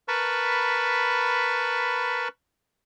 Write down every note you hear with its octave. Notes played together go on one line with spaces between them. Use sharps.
A#4 B4 A5 B5 C#6